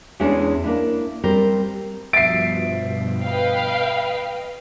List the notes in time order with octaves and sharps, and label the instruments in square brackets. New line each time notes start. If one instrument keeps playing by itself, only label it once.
[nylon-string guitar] E2 E3 G#3 C#4 D4 G#4
A#3 D4 E4
G3 C4 A#4 C5
[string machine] G2 B2 F3 [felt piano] E5 A6 [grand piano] C7 D7
[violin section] B4 F5 G5 [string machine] D#5